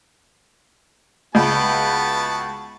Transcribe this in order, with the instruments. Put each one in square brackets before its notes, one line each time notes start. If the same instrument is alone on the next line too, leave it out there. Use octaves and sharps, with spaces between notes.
[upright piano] C#2 [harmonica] B3 F#4 A5